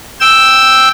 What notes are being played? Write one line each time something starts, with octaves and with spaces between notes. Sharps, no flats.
G5 E6